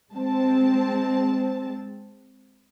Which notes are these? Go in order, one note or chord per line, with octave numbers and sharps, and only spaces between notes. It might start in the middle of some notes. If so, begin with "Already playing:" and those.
G#3 C4 A5